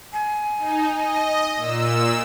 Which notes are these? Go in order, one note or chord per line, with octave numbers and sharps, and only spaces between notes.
G#5
D#4
D#5
A#2 E6